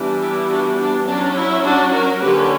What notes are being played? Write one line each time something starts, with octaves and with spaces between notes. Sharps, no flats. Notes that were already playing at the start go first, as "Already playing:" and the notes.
Already playing: E3 G3 B3 D4
E4 G4
D4 F#4
D4
F#3 C#4 D4
E4
D4 F#4
F#4 A#4
D3 F#3 A#3 C#4 G4 B4